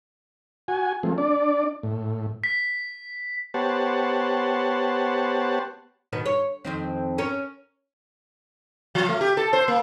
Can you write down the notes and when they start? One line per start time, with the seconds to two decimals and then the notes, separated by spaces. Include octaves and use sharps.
0.68 F#4 G#5
1.03 F3 G#3 A3 C4
1.18 D4 D5
1.83 A2
2.44 B6
3.54 B3 G4 C5 C#5 F#5 A5
6.13 B2 D#3 B3
6.26 C#5
6.65 F2 D#3 C4
7.18 C#4 A#4 C#5
8.95 F3
9.09 A3
9.21 G4
9.37 A4
9.53 C5
9.68 A#3